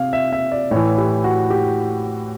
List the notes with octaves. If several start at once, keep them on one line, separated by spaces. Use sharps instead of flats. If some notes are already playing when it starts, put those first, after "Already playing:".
Already playing: C3 F5
E5
E5
D5
A2 E3 C#5
G4
F#4
G4